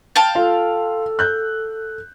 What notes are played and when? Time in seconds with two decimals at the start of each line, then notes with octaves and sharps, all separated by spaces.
0.16 F5 G5 A5
0.35 F4 A4
1.19 F#6 G6